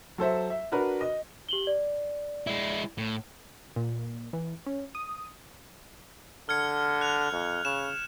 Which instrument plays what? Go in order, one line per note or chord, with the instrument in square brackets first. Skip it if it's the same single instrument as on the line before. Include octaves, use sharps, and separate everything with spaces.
[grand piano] F#3 A4 C5 E5
E5
D4 F#4 A#4 B4
D#5
[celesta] G4 F#7 G7
D5
[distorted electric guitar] G#3 E4
A2
[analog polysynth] A#2
E3
C#4
D#6
[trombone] D3 [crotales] F6 G#6 C#7
[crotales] F#6 F7
[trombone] F2
[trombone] C#3 [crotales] E7